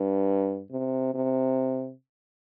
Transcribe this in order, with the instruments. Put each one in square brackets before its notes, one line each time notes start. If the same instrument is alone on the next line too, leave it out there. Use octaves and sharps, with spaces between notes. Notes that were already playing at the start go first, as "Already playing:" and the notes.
Already playing: [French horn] G2
C3
C3